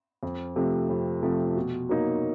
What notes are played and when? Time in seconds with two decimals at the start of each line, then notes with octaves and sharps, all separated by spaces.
0.23 F2
0.56 C3 F3 A3
0.89 F2
1.23 C3 F3 A3
1.56 B2
1.89 F#3 A#3 D#4